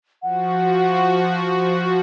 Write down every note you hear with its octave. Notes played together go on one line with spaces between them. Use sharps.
F3 F#4 F#5